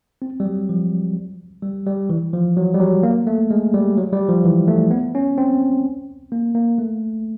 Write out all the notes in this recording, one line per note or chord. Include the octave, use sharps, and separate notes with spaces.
C4
G3
F#3
F3
G3
G3
E3
F3
F#3
G3
F#3
A#3
A3
G#3
G3
F#3
G3
F3
E3
A3
B3
C#4
C4
A#3
A#3
A3